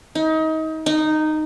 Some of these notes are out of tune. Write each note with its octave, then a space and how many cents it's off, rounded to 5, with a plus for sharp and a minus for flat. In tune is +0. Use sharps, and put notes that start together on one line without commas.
D#4 +30
D#4 -10